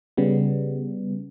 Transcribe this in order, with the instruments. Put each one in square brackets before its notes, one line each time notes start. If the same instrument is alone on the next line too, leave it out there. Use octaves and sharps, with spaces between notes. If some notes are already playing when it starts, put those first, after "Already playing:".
[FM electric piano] C#3 G3 B3